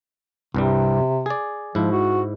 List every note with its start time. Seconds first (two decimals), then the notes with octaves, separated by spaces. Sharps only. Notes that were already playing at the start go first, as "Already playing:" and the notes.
0.54 C2 G2 C3 G3
1.26 G#4 D5
1.75 G#2 F3 E4
1.92 F#4